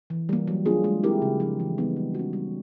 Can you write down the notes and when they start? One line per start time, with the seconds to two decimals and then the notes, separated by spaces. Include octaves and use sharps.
0.10 E3
0.29 G3 A#3
0.48 F#3
0.65 A#3 D4 F4 G#4
0.84 G#3
1.03 C4 E4 G4 A#4
1.22 C#3
1.40 F3 A#3 D4
1.60 E3
1.78 G3 B3 D#4
1.97 G#3
2.15 C#4 F#4
2.33 G3